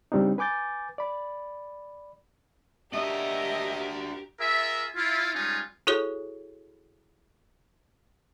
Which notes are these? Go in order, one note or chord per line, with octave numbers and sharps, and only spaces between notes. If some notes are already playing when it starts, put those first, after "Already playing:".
C#3 G3 C4 D4 D#4
B4 G#5 D6 G6 A6
D5 B5
D4 F#4 G4 A#4 D#5 E5
F4 G#4 A#4 E5
E4 F4
G3 G#3 C#4 D#4 F4 G#5
E4 F#4 G#4 A4 C#5